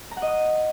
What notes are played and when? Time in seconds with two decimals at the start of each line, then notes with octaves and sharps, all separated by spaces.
0.11 A#5
0.17 F#5
0.22 D#5
0.28 D#6